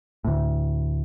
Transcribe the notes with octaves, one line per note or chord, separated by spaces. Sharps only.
D2 A2